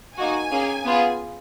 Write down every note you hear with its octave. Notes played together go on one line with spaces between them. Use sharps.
A#3 D#4 F#4 G#5
A#3 C#4 G#4
B3 F4 G#4